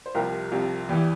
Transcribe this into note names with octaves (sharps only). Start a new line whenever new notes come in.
C5
C2 C3 F3 G4 A#4
C2 C3 F3
E2 E3 G4